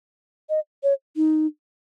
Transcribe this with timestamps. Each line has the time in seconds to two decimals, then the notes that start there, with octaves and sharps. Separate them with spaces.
0.50 D#5
0.83 C#5
1.16 D#4